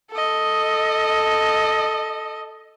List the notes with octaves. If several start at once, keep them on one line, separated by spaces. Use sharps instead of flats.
A4 D#5